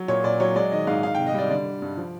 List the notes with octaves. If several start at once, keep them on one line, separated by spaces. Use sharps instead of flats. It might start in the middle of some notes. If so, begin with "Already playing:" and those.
Already playing: F#3
A#2 C#5
A#2 D5
F#3 C#5
G#3 D5
D#3 D#5
G#2 F5
D#3 F5
G5
C3
D#5
G3 D5
D3 D5
D3
G2
F3